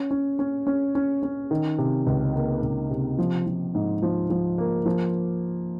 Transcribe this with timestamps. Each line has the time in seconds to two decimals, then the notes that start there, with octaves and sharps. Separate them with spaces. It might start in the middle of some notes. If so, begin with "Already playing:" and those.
Already playing: C#4
0.11 C#4
0.39 C#4
0.67 C#4
0.95 C#4
1.23 C#4
1.51 D#3
1.78 C3
2.07 C#2
2.35 A#3
2.63 C#2
2.90 C3
3.19 F3
3.47 F3
3.75 G#2
4.02 F3
4.30 F3
4.58 A#3
4.86 F3